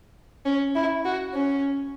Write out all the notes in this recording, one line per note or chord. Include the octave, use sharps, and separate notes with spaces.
C#4
E4
F#4
C#4